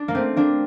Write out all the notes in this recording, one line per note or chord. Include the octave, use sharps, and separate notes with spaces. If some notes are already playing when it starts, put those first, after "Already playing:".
Already playing: D4
A#3
A3 C4
A#3 D4